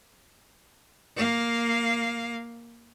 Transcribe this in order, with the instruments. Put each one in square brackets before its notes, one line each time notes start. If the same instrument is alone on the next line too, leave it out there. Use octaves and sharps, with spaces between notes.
[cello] A#3 F5